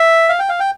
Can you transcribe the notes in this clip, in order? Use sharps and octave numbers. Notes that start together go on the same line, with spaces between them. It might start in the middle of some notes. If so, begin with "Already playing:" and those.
Already playing: E5
F5
G5
F5
G5